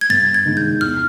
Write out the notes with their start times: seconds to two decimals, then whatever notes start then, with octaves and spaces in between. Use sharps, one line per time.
0.01 G#6
0.10 G2 A6
0.34 G#6
0.45 D#3 G#3
0.57 G6
0.81 E2 F6